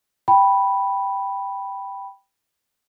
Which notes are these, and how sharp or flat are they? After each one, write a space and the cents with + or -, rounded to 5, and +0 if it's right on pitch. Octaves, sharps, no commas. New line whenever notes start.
G5 +0 B5 -5